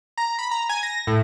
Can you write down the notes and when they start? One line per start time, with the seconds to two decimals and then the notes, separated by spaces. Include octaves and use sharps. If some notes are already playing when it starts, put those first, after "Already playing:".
0.18 A#5
0.39 B5
0.51 A#5
0.69 G#5
0.83 A#6
1.07 A2